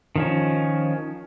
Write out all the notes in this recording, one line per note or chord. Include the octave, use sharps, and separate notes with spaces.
D#3 F3 C#4